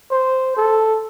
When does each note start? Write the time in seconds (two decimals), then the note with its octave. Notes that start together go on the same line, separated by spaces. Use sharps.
0.11 C5
0.57 A4